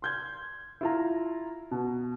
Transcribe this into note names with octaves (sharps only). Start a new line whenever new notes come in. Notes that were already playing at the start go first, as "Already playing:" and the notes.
C6 G6 G#6
E4 F4 A#5
B2